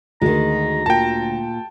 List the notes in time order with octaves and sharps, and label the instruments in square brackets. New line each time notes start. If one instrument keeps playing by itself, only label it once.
[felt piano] D2 [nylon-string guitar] D#3 G#3 [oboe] A#5
[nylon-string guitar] A#2 [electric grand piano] G5 A5